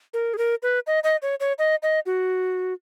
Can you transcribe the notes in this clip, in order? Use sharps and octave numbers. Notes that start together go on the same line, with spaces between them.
A#4
G#4
A#4
B4
D#5
D#5
C#5
C#5
D#5
D#5
F#4